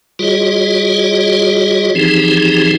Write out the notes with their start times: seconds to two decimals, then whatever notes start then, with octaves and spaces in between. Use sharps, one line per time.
0.19 G3 F4 F#4 G#4 C#5 D#5
1.95 E3 F3 C4 D#4 G4 G#4